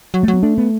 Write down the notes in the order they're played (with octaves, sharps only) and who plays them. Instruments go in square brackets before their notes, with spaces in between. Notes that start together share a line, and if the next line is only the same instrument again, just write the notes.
[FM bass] F#3
[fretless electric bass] A3
[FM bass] F#3
[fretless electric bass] B3
[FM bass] A3 [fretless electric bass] D4
[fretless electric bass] B3